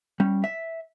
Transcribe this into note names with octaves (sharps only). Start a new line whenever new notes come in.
G3 C#4
E5